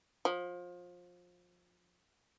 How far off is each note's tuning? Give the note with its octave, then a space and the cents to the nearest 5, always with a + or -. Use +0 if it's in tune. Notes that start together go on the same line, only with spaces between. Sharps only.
F3 +25